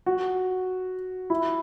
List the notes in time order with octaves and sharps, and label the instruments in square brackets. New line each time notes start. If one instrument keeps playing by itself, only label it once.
[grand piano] F#4
E4